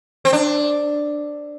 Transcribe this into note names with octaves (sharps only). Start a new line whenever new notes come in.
C4
D4